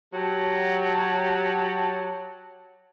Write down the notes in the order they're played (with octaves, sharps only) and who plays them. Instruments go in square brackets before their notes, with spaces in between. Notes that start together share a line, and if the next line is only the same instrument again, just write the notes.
[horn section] F#3 G4 A5